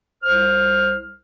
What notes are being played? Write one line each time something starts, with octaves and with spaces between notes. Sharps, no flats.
C2 C5 F6